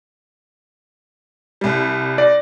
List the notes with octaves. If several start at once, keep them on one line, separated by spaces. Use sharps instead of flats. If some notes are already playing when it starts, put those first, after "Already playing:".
C2 G3
D5 A#6